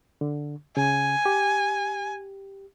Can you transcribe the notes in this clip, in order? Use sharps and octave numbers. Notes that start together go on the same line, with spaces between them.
D3
C#3 G#5
G4